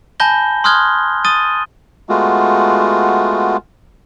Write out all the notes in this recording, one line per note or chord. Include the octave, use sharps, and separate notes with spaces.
G#5 A5 B5 G6 A#6 G7
C6 D#6 F6 F#6 G#6 G7
D#6 A6 D#7 G7
G#3 A3 B3 F4 F#4